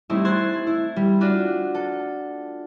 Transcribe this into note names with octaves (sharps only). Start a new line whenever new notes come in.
G3 A3 C4 D#4 E4
C5 C6 F#6 G#6 A6
E4
G3
D4 F4 F#4
A4